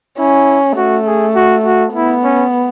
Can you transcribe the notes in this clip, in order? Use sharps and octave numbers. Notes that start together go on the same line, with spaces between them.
C#4 E4
A3 F#4
G#4
F#4
F#4
B3 E4
C#4